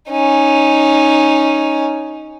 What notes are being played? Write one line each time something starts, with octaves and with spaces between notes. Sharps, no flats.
C#4 D#4